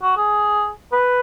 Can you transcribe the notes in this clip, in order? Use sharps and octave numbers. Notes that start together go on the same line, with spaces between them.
F#4
G#4
B4